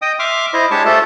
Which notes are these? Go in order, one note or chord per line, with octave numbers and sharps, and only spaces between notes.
D#5 G5 D#6
E5 C6 D6 F6
E4 C5 D#5
G#3 D4 G4 C#5 A5 C#6
A3 F4 G4 A4 C5 A5